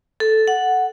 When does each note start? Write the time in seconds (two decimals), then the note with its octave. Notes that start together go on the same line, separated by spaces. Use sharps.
0.20 A4
0.48 F#5